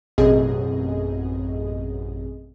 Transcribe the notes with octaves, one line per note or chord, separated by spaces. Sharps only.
A1 F#2 B2 C4 G#4 D#5